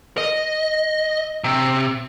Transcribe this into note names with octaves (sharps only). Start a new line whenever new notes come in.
D#5
C3